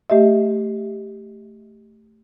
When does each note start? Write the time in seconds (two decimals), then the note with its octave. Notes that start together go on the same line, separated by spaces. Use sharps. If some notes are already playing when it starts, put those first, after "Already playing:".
0.10 A3 G4 D#5 E5